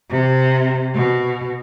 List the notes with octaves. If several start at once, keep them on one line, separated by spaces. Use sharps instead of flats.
C3
B2